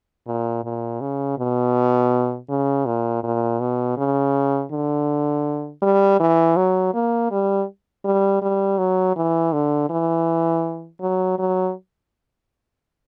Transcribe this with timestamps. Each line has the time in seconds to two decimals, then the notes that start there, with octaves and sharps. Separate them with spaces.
0.27 A#2
0.64 A#2
1.01 C#3
1.38 B2
2.49 C#3
2.86 A#2
3.23 A#2
3.60 B2
3.97 C#3
4.72 D3
5.82 G3
6.20 E3
6.57 F#3
6.94 A#3
7.31 G3
8.05 G3
8.42 G3
8.78 F#3
9.16 E3
9.53 D3
9.90 E3
11.01 F#3
11.39 F#3